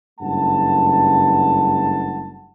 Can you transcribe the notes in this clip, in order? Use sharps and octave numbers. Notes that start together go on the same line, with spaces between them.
F#1 G2 A3 F#5 A5